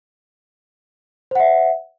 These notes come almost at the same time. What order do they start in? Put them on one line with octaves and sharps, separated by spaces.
C5 F#5 E5